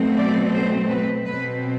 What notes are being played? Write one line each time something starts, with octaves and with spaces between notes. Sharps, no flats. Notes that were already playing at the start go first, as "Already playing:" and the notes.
Already playing: B2 F#3 A3 C4
D5
C5
B4
B2 F#3 C4 B4